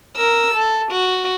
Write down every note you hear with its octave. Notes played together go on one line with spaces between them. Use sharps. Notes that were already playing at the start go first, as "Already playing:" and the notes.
A#4 E6
A4
F#4